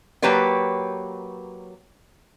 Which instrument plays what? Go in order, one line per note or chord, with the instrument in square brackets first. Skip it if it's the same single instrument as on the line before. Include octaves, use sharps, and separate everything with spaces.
[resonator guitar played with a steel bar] F#3 A#3 G4 B4 C#5 D5